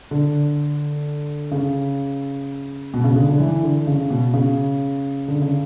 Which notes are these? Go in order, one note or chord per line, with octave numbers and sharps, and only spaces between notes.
D3
C#3
B2
C#3
D3
D3
E3
D3
C#3
B2
C#3
D3
C#3